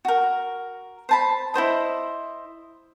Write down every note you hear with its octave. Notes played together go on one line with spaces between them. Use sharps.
F#4 A#4
C5 A5 B5
E4 F#4 C5 D#5